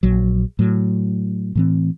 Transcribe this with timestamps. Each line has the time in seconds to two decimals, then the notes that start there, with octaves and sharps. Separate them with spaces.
0.03 A#1 F#3
0.59 A2 F#3
1.55 A2 E3 C4